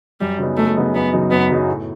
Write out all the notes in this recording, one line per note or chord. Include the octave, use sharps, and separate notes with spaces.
F#2 G3
C#3 F#3 B3 D#4
F#2 A3
C#3 F#3 B3 D#4
F#2 B3
C#3 F#3 B3 D#4
F#2 B3
C#3 F#3 B3 D#4
A2